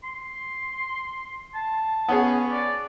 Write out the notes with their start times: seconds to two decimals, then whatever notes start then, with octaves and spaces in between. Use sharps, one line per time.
0.04 C6
1.54 A5
2.09 B3 C#4 G#4
2.52 D5